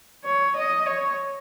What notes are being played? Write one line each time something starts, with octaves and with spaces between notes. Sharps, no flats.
C#5
D#5
C#5